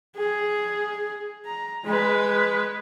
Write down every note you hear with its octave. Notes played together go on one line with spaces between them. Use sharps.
G#4
A#5
G#3 B4